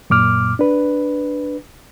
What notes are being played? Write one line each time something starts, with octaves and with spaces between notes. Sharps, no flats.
F#2 A#2 D6 F6
D4 B4